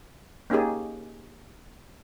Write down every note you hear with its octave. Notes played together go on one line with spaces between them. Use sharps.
A#3 C#4 D#4 G4 G#4